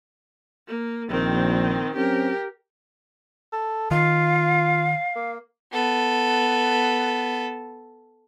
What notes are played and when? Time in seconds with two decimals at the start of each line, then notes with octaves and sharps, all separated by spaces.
0.68 A#3
1.09 A#1 D#3 C4
1.95 F#3 C4 C#4 G4 A#4
3.52 A4
3.91 D#3 F4 F5
5.15 A#3
5.73 B3 A4